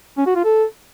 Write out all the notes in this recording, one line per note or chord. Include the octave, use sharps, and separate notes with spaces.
C#4
F#4
F4
A4